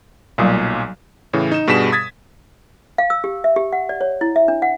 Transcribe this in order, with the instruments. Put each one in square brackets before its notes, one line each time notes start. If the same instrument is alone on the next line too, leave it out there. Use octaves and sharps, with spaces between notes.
[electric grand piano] B1 A#2 [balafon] F#3 G3
[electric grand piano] A2 C#3 E3
D#4 E7
G2 B2 G3 G#4 B6 E7
D#6 G#6 A6 B6
[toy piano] F5
E6
G4
E5
G4
F#5
D5
C#5
E4
E5
D4
F#5